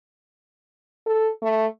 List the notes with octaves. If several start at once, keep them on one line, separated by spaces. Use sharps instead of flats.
A4
A3